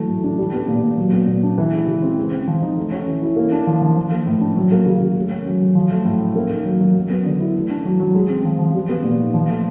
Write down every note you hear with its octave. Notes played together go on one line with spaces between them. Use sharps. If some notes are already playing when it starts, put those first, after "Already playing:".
Already playing: E3 F#3 A3
A2
D4
G3
B3
A#2
A#2
F#3
B3
A#2
D4
E3
G#3
C#3
C4
G#3
C4
F3
D#4
A3
C#4
E3
E4
A#3
D4
F3
F3
F3
A#3
A2
D4
F#3
A#3
C#3
C#3
A3
C#4
F#3
F#3
F3
A3
A2
C#4
A#3
D#4
F#3
F#3
F#3
B3
D3
E4
A3
D4
F#3
F#3
G#3
C4
F3
F3
G3
B3
A#2
D#4
F3
A3